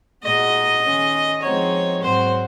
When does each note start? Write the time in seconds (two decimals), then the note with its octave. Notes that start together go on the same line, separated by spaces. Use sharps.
0.23 A#2 G#3 D#4 F#4 D#5
0.83 D#3 G#3 C#4
1.42 F3 G#3 C4 D#4 F#4 C#5
2.01 G#2 F#3 C4 F#4 C5